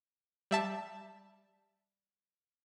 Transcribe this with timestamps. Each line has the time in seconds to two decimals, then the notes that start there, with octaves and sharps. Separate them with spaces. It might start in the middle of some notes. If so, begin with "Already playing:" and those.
0.51 G3 E5 A5